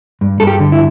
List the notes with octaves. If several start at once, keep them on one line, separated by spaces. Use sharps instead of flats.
G2
G2 A4
G4
D3
E4